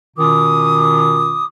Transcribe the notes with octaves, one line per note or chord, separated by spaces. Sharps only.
B2 D#3 C#4 F4 D6 D#6